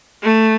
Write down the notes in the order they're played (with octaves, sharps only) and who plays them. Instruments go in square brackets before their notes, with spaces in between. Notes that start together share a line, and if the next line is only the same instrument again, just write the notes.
[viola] A3